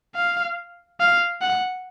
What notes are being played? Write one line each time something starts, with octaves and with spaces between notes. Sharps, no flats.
F5
F5
F#5